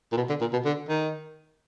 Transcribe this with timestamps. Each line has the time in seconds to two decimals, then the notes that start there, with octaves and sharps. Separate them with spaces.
0.12 A#2
0.17 B2
0.29 D3
0.41 A#2
0.53 B2
0.65 D3
0.89 D#3